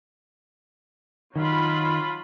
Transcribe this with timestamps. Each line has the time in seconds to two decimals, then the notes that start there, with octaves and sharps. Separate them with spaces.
1.36 D#3 F#3 F4 B5